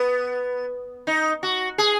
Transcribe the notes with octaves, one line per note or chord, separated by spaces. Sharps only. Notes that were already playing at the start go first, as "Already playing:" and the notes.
Already playing: B3
D#4
F#4
G#4